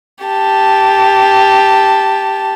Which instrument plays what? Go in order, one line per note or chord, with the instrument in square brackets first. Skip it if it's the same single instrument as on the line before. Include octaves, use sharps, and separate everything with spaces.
[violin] G4 A5